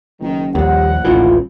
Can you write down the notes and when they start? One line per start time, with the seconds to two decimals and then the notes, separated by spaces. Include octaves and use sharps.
0.21 F#1 D#3
0.55 A#1 D#2 G3 F#5
1.05 D#1 A1 D2 E3 F4